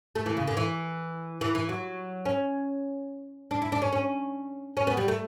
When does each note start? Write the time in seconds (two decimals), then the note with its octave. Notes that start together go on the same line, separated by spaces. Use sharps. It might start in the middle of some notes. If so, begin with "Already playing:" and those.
0.15 A3
0.26 E3
0.37 C#3
0.47 D3
0.57 E3
1.41 E3
1.55 E3
1.69 F#3
2.25 C#4
3.51 D4
3.62 E4
3.72 D4
3.82 C#4
3.92 C#4
4.77 C#4
4.87 B3
4.97 G3
5.08 A3